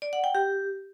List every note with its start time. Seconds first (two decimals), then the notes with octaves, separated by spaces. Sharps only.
0.02 D5
0.13 F#5
0.24 G5
0.35 G4